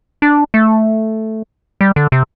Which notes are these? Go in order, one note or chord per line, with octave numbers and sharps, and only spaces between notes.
D4
A3
G3
D3
C3